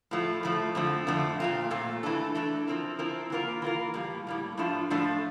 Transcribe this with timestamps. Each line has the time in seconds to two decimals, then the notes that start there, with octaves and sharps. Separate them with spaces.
0.11 A2 F3 A3
0.43 A2 F3 A3
0.75 F2 D3 F3 A3
1.07 F2 D3 F3 A3
1.40 A#2 A3 C4 F4
1.71 A#2 A3 C4 F4
2.03 E3 A3 D4 A4
2.35 E3 A3 D4 A4
2.67 F3 C4 E4 A#4
2.99 F3 C4 E4 A#4
3.30 E3 A#3 F4 A#4
3.62 E3 A#3 F4 A#4
3.94 A2 G3 A#3
4.27 A2 G3 A#3
4.57 A2 F3 A3 D4 F4
4.90 A2 F3 A3 D4 F4